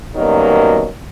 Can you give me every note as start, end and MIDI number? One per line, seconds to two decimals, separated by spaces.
0.16 0.86 42
0.16 0.86 47
0.16 0.86 51
0.16 0.86 54
0.16 0.86 55
0.16 0.86 58